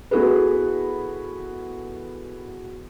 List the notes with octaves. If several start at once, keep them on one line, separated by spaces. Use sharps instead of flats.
B3 E4 F#4 G#4 A4 B4